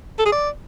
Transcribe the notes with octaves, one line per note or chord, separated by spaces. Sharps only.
A4
G#4
D5